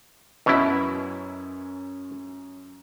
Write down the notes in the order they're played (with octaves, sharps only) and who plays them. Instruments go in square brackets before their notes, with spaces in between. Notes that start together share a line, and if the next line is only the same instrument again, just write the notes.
[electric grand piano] F#2 C#4 E6 [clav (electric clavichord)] B2 E4